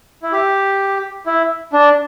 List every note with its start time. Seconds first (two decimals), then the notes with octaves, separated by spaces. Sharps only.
0.23 E4
0.32 G4
1.26 E4
1.73 D4